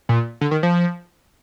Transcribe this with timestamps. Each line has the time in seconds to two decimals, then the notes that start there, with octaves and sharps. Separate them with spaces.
0.09 A#2
0.41 D3
0.51 D#3
0.63 F3